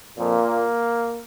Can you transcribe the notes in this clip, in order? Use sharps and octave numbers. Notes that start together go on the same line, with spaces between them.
F2 A#2 F3 A#3